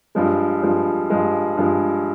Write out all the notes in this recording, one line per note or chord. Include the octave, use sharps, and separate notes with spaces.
G2 F3 G#3
G2 F3 G#3
G2 F3 G#3
G2 F3 G#3